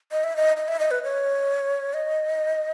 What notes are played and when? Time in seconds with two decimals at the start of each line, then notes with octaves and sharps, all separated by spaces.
0.12 D#5
0.24 E5
0.37 D#5
0.57 D#5
0.68 E5
0.79 D#5
0.91 B4
1.03 C#5
1.94 D#5